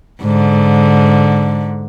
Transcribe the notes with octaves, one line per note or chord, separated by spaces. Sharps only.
G#2 D3